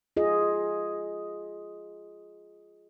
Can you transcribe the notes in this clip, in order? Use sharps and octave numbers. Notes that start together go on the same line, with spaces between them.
F4 G#4 D#5